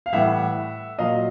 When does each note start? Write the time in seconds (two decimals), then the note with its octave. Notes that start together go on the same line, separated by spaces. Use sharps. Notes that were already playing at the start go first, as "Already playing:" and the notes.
0.06 F5
0.13 A2 E3 G3 E5 F#5
0.98 A#2 F#3 D#5 F5